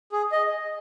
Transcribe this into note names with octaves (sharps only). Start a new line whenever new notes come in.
G#4
D#5